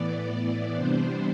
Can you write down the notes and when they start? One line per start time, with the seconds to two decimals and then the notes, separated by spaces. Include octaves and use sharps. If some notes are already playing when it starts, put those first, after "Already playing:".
Already playing: A2 E3 B3 D5
0.74 C3 E3 G3 B3 D4 C5